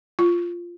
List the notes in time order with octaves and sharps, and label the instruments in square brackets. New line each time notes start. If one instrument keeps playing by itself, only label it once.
[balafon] F4